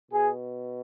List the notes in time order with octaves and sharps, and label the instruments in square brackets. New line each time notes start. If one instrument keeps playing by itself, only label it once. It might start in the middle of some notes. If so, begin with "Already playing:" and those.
[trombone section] B2 G#4